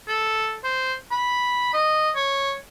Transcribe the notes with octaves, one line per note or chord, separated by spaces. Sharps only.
A4
C5
B5
D#5
C#5